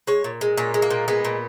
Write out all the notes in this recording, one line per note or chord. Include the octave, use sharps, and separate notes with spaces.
G#3 C#5
A#2
G#3
A#2 C#4
G#3
A#3
A#2
G#3 B3
A#2